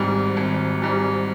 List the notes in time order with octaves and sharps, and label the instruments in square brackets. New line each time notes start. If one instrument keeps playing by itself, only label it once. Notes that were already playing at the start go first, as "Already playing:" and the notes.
Already playing: [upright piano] G#1 G#2 G3
G#1
G#2 G3